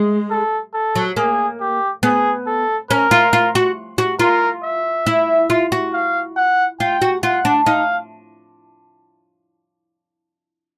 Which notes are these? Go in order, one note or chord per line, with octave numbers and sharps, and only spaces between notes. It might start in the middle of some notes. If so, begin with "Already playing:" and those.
Already playing: G#3
A4
A4
F#3
A#3 G#4
G4
B3 G#4
A4
C#4 A#4
F4
F4
F#4
F#4
F4 A#4
E5
E4
F4
F#4
F5
F#5
F4 G5
F#4
F4 F#5
D4
D#4 F5